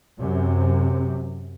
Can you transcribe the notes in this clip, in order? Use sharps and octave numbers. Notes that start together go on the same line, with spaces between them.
F#2 C3